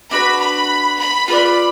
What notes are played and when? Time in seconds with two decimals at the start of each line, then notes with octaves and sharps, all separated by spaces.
0.11 D4 F#4 B4 B5
0.40 B5
0.99 B5
1.28 F4 B4 D5 B5